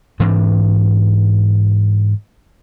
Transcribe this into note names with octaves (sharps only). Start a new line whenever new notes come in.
G#2 E3 C4 D4